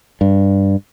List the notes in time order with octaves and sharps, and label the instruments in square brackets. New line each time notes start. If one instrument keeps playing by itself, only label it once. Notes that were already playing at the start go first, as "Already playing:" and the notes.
[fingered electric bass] G2